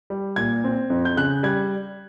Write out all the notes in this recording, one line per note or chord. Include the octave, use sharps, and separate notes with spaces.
G3
A#2 G#6
C4
F2
G6
C#3 F#6
G3 G#6